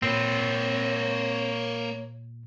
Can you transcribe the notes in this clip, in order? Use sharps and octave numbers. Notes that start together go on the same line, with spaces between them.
A#2 A#3 C4 B4 C#5